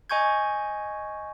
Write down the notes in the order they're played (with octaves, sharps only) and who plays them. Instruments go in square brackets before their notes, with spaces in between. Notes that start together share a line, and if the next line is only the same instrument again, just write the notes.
[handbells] D#5 G#5 C#6 G6 G#6